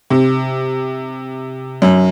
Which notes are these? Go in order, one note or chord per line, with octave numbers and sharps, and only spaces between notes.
C3
F#2